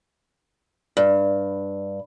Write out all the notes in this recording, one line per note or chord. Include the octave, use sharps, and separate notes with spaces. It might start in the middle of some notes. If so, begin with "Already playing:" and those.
G2